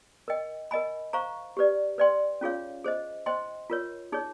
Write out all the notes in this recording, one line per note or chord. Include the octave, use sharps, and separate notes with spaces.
A#4 D#5 G5
A#4 D#5 G#5 B5
C5 F5 A#5 C#6
G4 B4 D5
B4 D5 G5 C6
C#4 F4 G#4 C#5 F5
G#4 C5 D#5
C5 D#5 G5 C6
F4 A#4 C#5
D#4 G#4 C#5